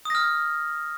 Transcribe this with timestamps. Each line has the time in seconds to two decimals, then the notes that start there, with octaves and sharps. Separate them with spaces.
0.05 D#6
0.10 A#6
0.15 F6